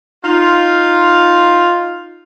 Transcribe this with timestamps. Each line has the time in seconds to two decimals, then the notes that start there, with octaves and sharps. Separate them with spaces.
0.24 D#4 F4